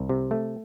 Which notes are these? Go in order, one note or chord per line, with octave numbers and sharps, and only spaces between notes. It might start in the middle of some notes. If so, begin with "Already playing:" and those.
Already playing: C2
C3
A3